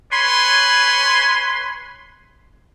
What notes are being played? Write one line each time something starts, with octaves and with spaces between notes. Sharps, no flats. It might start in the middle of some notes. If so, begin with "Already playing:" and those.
B4 C#5 G#5 B5 C6